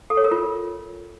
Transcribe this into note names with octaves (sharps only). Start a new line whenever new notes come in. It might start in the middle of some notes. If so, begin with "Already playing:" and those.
A4
C#5
A#4
F4